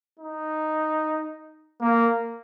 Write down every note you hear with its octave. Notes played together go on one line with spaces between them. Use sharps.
D#4
A#3